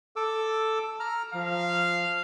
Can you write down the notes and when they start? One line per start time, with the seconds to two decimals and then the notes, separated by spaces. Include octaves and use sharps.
0.16 A4 D6 E6
1.00 A#5 F6
1.34 F3 F5